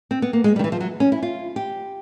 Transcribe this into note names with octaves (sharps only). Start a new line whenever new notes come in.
C4
B3
A#3
G#3
G3
D#3
E3
F3
F#3
C#4
E4
F4
G4